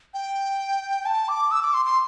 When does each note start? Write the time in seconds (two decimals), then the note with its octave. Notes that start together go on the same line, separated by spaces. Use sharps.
0.14 G5
1.05 A5
1.28 D6
1.51 E6
1.62 D6
1.74 C6
1.85 C6